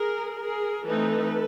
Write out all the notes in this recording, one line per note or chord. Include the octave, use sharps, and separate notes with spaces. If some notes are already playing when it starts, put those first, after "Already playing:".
Already playing: G#4 A#4
G#4 A#4
E3 A3 C4 D#4 A4 B4